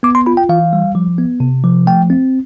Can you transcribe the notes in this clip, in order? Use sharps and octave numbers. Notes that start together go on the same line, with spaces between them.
B3 D6
C6
F4 B5
G5
E3 F5
G3
F3
B3
C3
F3
A3 G5
C4